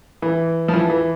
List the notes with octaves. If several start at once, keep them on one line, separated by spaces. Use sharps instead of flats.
E3
F3
E3
E3